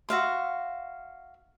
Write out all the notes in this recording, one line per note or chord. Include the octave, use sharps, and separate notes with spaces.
F#4 E5 F5 C6